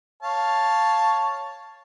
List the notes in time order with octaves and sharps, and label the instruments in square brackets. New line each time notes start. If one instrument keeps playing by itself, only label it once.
[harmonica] C#5 F5 A5